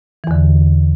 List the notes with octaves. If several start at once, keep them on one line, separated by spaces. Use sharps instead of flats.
E2 D3 E3